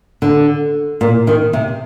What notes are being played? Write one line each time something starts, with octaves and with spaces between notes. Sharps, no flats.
D3
A#2
D#3
C3